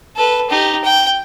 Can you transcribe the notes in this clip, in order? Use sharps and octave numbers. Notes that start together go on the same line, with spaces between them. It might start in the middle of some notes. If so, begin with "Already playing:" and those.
A4 B4
D#4 G4
G5